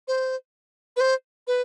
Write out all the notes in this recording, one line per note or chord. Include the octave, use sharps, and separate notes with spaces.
C5
B4
C5
B4